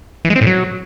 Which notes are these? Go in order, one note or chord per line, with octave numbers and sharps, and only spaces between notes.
E3
G#3
C4
A2
F#3